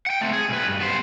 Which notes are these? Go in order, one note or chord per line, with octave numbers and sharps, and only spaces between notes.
F#5 G5
A3 C4
G#4
B1 B4
G2
B3 C5